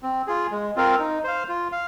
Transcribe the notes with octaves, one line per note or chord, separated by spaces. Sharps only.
C4
F4 G#4
G#3
C4 F4 A#4 F5
D#4
C5 F5
F4
F5